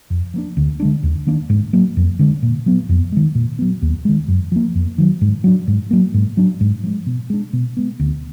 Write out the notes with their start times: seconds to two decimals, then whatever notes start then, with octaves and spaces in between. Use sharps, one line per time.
0.10 F2
0.34 F3 A#3 D4
0.57 D2
0.80 D3 G#3 D4
1.03 D#2
1.27 D#3 A#3 D4
1.49 G#2
1.73 F#3 A#3
1.97 F2
2.19 D3 G#3 D4
2.43 A#2
2.66 F#3 B3
2.89 F2
3.12 D#3 G#3
3.35 A#2
3.59 F#3 B3
3.82 D#2
4.05 D#3 G#3
4.28 F#2
4.52 F3 A#3
4.75 F2
4.98 D#3 F#3
5.21 G#2
5.44 F#3 D4
5.67 G#2
5.91 F#3 A#3
6.14 G#2
6.37 F#3 D4
6.60 G#2
6.83 F3 G#3
7.06 B2
7.30 G#3 D4
7.53 B2
7.77 G#3 B3
8.00 D2